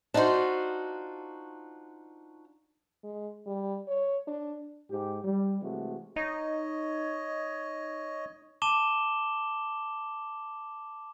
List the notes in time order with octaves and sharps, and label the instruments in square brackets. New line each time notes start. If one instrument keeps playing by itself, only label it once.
[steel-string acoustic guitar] D4 D#4 F4 F#4 C5
[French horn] G#3
G3
C#5
D4
[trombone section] G#2 G4
G3
C3 E3 G#3 A3 F#4
[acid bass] D#4 [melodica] C#5 D#5
[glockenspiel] A5 D6 E7 G7